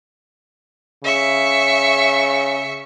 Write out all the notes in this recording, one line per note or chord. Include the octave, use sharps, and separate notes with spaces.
C#3 E5 C#6